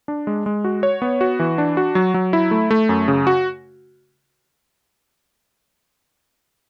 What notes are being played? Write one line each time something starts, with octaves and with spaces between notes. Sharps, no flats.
D4
G#3
G#3
F#4
C#5
B3
F#4
E3
D4
F#4
F#3
F#3
E4
A3
A3
F#2
C#3
F#4